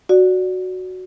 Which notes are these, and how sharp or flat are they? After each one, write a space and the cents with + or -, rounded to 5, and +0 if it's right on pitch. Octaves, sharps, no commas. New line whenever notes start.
F#4 +0 D5 +0